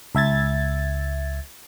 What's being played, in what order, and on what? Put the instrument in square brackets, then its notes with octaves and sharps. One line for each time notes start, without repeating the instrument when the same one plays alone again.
[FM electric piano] C#2 E5 G#6 A6